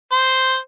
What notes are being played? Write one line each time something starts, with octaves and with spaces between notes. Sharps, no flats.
C5